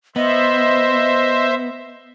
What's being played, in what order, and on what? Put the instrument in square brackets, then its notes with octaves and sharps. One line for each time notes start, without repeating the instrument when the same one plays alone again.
[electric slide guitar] B3 [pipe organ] C5 E5 [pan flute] D#5